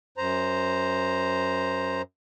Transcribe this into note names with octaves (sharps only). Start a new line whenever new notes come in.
F#2 C5 A#5